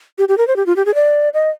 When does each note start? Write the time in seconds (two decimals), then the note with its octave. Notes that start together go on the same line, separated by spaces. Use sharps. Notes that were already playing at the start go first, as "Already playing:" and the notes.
0.18 G4
0.29 G4
0.38 A#4
0.48 C5
0.56 G4
0.66 F4
0.76 G4
0.86 G#4
0.95 D5
1.34 D#5